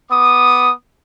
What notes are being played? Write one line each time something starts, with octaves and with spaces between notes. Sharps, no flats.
B3 D6 D#6